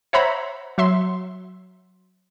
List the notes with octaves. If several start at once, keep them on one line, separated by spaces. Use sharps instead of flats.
C5 C#5 E5 F#5 A#5 B5
F#3 E5 C6